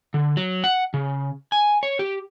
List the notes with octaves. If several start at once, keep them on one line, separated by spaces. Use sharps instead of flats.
D3
F#3
F#5
C#3
G#5
C#5
G4